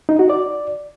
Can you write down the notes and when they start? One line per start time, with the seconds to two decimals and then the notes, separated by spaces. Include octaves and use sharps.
0.09 D#4
0.19 F#4
0.30 D5